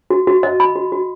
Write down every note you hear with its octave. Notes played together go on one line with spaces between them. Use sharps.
F#4
F#4
D#5
B5
F#4
F#4